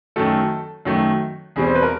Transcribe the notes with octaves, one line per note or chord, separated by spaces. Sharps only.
F#2 D#3 F#3 A3 A4
F#2 D#3 F#3 A3
E2 B2 G3 C4 G#4
C5
B4
A#4